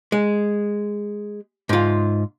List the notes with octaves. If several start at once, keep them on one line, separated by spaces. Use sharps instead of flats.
G#3
G#2 F4